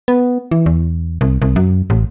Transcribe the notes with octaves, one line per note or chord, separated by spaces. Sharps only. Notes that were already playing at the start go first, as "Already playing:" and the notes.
B3
E3
E2
C2
C2
F#2
A1